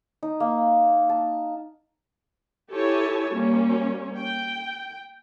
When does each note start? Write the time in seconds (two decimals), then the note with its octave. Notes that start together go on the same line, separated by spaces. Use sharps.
0.23 D#4
0.40 A#3
1.09 A5
2.72 E4 G4 A4 C#5 G#5 A5
3.34 G3 A#3 C#4
4.16 G5